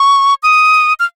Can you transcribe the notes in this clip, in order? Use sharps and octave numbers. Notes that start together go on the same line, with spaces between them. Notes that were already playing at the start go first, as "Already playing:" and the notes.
Already playing: C#6
D#6
F6